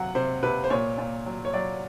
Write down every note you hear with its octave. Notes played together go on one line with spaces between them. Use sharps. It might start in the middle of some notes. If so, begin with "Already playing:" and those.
Already playing: C3 F#3 F#5
C3 C5
C3 B4
C5
A#2 C#5
A#2
F#3
C#5
F#3 D5